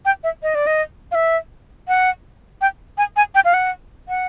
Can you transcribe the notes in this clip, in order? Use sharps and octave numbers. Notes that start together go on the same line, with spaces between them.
G5
E5
D#5
D5
D#5
F5
E5
F#5
G5
G#5
G#5
G5
F5
F#5
F#5